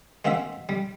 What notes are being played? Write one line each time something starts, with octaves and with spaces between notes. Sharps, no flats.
G#3 A#3 C4 F#4 E5
G3